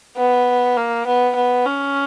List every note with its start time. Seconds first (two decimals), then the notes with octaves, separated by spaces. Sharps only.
0.17 B3
0.77 A#3
1.07 B3
1.36 B3
1.66 C#4